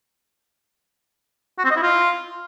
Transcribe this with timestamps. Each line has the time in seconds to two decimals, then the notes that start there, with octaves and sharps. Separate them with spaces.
1.59 F#4
1.65 C4
1.71 D#5
1.77 E4
1.83 F4